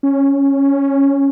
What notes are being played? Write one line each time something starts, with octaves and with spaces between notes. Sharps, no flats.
C#4